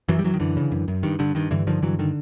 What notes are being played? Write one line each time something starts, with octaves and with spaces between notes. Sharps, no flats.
F#2 E3 F#3
G3
F#2 E3 F#3
D#3
F#2 D3 E3
C#3
F#2
F#2
G2 D#3
G2 D3
G2 D#3
G2 D3 E3
D3 D#3 F3
G2 E3 F#3
D3 D#3